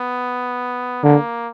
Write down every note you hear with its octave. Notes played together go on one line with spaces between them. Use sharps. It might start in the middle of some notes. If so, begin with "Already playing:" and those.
Already playing: B3
D3 A#3